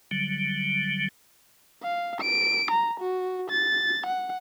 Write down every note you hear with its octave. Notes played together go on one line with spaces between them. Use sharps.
D3 F#3 G3
F5
D7
A#5
F#4
A6
F#5